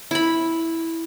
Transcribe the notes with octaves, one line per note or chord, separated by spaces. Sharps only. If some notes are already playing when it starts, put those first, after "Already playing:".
E4 B5